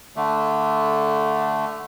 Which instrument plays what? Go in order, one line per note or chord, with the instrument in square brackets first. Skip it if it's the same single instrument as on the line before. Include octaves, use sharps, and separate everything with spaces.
[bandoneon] D3 A3